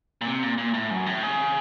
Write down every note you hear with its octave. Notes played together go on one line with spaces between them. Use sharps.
A#2
C3
A#2
A#2
A2
F#2
A2
C#3